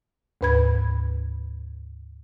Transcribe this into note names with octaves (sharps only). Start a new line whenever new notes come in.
D2 G#2 B4 B5 G#6